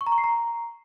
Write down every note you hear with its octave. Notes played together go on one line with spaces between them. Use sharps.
C#6
A#5
C#6
C7
A#5